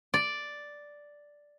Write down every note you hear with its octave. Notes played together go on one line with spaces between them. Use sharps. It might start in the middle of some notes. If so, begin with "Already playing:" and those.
D5